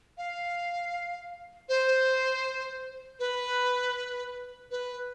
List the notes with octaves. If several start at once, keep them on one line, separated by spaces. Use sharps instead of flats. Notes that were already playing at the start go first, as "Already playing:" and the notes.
F5
C5
B4
B4